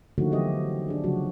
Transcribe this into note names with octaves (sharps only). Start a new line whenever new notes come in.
D3 D#3 F3 A3 A#3 F#4
E3 F#3 B3 G4 D#5
D4 G#4
C#3 F3 F#3 A3 C#4 F#4